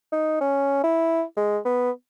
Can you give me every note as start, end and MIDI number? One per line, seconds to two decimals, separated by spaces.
0.12 0.39 63
0.41 0.79 61
0.84 1.23 64
1.36 1.58 56
1.65 1.91 59